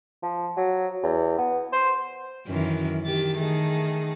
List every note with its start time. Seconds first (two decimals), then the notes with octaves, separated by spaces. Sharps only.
0.22 F3
0.57 F#3
1.03 E2
1.38 B3
1.72 C5
2.47 F#2 D#3 E3
3.06 D#3 G4 A6
3.38 D#3 A3 G#4